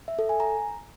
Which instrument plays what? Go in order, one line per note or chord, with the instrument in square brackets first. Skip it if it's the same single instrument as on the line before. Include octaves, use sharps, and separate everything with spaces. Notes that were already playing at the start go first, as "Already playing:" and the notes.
[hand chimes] E5
A4
G#5
A#5